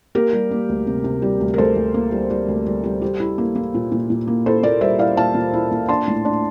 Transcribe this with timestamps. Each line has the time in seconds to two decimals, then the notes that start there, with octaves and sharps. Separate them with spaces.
0.15 A#3 G4 A#4
0.33 G3
0.51 A#3
0.69 D2
0.87 C3
1.04 C3
1.22 G3
1.40 D2
1.54 A#4
1.58 D2 A4 C5
1.76 D2
1.94 A#3
2.12 G3
2.30 G3
2.48 D2
2.66 G3
2.84 G3
3.02 G3
3.20 E4
3.38 A#3
3.56 A#3
3.74 A#2
3.92 A#2
4.10 A#2
4.27 A#3
4.46 E4 A4 C5
4.63 A#2 A#4 D5
4.81 G3 C5 E5
4.99 E4 D5 F5
5.17 A#2 F5 A5
5.35 A#2
5.53 E4
5.71 A#2
5.89 D4 A5 C6
6.08 A2
6.25 D4